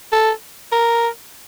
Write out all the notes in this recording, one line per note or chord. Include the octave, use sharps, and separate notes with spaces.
A4
A#4